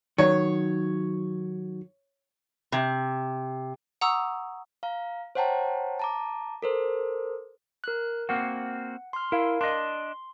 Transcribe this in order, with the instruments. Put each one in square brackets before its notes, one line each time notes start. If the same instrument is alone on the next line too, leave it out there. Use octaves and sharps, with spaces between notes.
[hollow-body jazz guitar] D#3 F#3 [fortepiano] C#5
[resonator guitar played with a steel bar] C3
[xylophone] F#5 A#5 C#6 D#6 E6
[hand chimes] F5 A#5
C5 C#5 F#5 G5 A5 A#5
A5 A#5 D6
A4 A#4 C5
[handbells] A#4 F#6
[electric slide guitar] A#3 C4 F#4 [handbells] F#5
[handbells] C6 F6
[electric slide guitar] E4 [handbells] A#4 F5
[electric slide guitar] D4 D#5 [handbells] C6